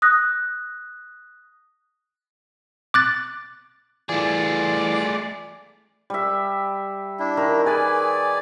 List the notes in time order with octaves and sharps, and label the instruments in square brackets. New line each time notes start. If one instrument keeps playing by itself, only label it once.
[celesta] D#6 F#6 A#6
[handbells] D6 F#6 A6
[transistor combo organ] E3 F4 [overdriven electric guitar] A3 G#4 [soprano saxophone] D5
[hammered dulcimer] G3 E5
[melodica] D4 E4
[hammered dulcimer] D#3 A#4
[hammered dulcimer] G#4 B4 [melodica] D5 G#5